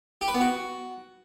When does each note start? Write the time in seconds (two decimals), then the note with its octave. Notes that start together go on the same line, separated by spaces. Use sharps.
0.21 G4
0.28 B4
0.34 B3
0.41 F#4